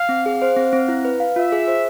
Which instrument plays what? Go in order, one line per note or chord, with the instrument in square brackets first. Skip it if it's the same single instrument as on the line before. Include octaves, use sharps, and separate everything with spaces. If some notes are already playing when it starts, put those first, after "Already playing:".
Already playing: [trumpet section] F5
[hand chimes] C4
G#4
C5
C4
C4
E4
B4
F5
[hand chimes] F4 [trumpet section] E5
[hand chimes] G#4
C5